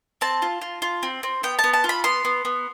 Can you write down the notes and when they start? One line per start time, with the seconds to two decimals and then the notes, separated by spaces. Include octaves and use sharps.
0.21 C4 A5
0.42 F4
0.61 F4
0.82 F4
1.03 C4
1.23 C4
1.43 B3 G5
1.59 A5
1.64 B3
1.73 A5
1.84 F4
1.89 B5
2.04 B3 C6
2.25 B3
2.45 B3